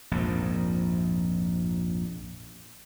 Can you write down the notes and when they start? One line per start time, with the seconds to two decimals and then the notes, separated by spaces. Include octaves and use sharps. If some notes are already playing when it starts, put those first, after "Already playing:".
0.11 A#1 F2 G#2